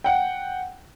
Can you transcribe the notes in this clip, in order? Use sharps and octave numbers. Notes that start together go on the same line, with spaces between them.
F#5 G5